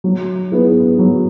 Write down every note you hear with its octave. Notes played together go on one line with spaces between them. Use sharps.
F#3
B3 E4 G#4
F#3